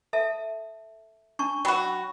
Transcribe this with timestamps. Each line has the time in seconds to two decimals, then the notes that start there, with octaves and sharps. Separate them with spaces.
0.13 A4 E5 A5
1.39 D4 A5 C#6
1.65 F#3 F#4 G5 B5